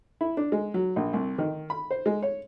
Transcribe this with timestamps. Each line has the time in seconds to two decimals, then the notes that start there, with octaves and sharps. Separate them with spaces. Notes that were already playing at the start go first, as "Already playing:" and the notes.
0.21 E4
0.37 D4
0.52 G#3
0.74 F#3
0.96 A#1
1.13 C2
1.38 D#3
1.70 B5
1.91 C5
2.06 G#3
2.23 C#5